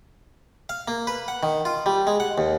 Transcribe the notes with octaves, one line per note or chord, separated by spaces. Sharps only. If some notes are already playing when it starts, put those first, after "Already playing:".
F5
A#3
B4
F#5
D#3
F4
G3
G#3
F#5
D#2